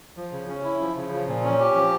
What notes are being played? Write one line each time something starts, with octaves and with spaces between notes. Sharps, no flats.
F3
C#3
C#4
E4
F3
C#3
F3
A#2
C#4
G4
F3